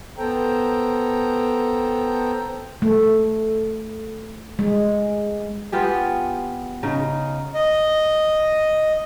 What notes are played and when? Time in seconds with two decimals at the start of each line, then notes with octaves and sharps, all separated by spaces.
0.18 B3 A4 C5 G5 A#5
2.82 A3
4.59 G#3
5.72 B3 F4 G4 G#4
6.83 C#3 D#4
7.55 D#5